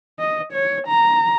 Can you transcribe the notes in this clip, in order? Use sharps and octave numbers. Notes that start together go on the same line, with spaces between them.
D#5
C#5
A#5